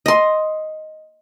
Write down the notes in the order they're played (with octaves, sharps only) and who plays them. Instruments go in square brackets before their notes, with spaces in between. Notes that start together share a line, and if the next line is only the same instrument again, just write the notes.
[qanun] D#5 C6